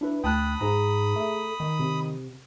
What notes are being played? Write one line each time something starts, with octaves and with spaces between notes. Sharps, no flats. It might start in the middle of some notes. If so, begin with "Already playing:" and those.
D4 E4 B4
D2 G5 A5 B5 D#6 F#6
G#2 G#4 A#5
A3
D#3
C3